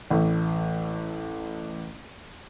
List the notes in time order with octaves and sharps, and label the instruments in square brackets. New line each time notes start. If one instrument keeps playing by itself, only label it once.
[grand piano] A1 A3